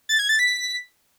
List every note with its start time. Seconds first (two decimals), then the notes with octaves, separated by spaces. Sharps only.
0.09 A6
0.19 G#6
0.29 A6
0.39 B6